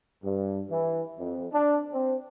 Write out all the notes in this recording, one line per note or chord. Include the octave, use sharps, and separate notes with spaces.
G2
E3
F2
D4
C4